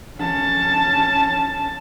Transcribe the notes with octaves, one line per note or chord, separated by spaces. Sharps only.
C#4 A5